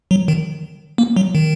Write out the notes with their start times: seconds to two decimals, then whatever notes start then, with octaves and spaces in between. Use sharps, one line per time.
0.11 F#3
0.28 D#3
0.98 A#3
1.17 F#3
1.35 D#3